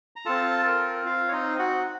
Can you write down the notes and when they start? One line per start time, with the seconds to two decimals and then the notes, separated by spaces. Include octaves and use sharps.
0.16 A#5
0.26 C4 F4 A4 A5
0.67 A#4
1.06 F4 F5
1.28 C#5
1.32 D#4 D#5
1.59 F#4 F#5